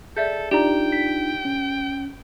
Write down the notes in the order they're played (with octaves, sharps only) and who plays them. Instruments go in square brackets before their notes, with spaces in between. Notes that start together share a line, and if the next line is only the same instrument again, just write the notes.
[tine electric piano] G#4 [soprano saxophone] A4 [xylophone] D5 E5 G6
[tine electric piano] D4 D#4 F4 [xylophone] G4 D5 A#5 [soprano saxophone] G5
[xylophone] B6
[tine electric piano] C#4